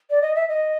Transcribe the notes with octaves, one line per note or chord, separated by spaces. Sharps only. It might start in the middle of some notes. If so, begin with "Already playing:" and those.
D5
D#5
E5
D#5